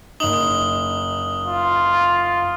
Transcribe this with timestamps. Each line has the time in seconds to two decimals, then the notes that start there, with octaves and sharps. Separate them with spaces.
0.20 F#1 D#4 D#6 F#7 G7
1.46 F4